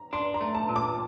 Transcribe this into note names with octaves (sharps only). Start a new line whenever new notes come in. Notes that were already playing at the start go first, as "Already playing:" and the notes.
Already playing: A#5
D4 C6
A#5
A3
A5
A#2
D6